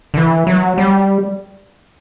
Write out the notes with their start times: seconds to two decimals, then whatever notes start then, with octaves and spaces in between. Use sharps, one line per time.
0.14 D3
0.17 E3
0.47 F#3
0.78 G3